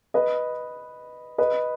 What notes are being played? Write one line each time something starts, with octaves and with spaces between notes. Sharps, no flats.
B4 D#5
B4 D#5